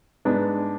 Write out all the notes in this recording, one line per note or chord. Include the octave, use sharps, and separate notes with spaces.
G#2 G#3 B3 D4